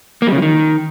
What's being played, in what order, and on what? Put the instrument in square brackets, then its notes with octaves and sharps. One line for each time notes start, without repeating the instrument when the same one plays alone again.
[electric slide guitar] A#3
G3
C#3
F3
D#3